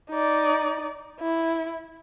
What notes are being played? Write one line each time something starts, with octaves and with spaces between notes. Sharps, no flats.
D#4 D5
E4